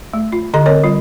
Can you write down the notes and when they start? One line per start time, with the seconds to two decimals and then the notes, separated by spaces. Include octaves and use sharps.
0.14 A3
0.32 F4
0.54 D3 G4 D#5 C6
0.66 C4 A#4 C#5 D#5
0.83 G3 F4